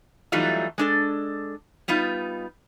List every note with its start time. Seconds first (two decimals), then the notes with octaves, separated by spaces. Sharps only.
0.32 E3 F#3 G3 A3 D#4 F4
0.78 G#3 D4 A4
1.88 G3 B3 D#4 F4